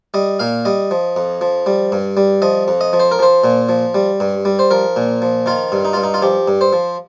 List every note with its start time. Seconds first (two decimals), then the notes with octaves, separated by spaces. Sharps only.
0.14 G3 D#5
0.40 A#2 F5
0.65 G3 D#5
0.91 F3
1.16 F2
1.41 F3
1.66 G3
1.92 G2
2.17 G3
2.42 F3 D#5
2.68 F2
2.81 D#5
2.93 F3
3.00 C5
3.11 A#4
3.19 F3 C5
3.44 A#2
3.69 F3
3.95 G3
4.20 G2
4.45 G3
4.59 C5
4.71 F3 A#4
4.96 A#2
5.22 F3
5.46 D#3 F4
5.72 G2
5.85 D#4
5.93 G2 F4
6.03 D#4
6.14 F4
6.22 F3 G4
6.48 G2
6.61 C5
6.73 F3